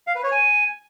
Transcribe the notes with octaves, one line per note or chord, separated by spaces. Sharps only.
F5
B4
C#5
G#5